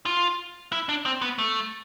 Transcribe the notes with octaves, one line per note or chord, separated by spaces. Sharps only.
F4
E4
D4
C4
B3
A3